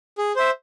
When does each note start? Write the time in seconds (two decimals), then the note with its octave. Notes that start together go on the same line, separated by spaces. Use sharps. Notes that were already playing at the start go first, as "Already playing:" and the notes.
0.18 G#4
0.36 C5 E5